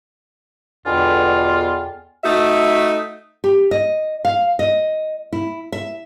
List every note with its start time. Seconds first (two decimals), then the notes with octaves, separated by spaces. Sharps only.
0.86 E2 B2 D3 F4 A4 G5 G#5
2.24 A3 D#4 F#4 E5
3.44 G4
3.71 D#5
4.25 F5
4.59 D#5
5.33 E4
5.72 E5